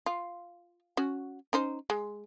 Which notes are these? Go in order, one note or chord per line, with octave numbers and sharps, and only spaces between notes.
F4
C#4 F#4
C#4 D#4 C5
G#3